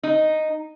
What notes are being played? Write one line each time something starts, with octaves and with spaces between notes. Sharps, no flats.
D#4